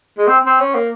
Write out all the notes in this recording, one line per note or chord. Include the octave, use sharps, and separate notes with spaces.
G#3
C4
C4
C#4
A#3